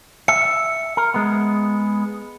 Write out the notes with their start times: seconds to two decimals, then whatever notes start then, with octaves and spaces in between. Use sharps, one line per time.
0.28 E5 C#7
0.97 A#4
1.14 G#3 B3